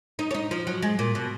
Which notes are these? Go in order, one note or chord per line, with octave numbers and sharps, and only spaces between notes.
D#4
C#4
D#4
F3
F#3
G#3
A#2
B2